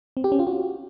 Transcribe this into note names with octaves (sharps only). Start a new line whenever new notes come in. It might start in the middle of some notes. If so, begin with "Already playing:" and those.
C4
G4
C#4
F4
F#4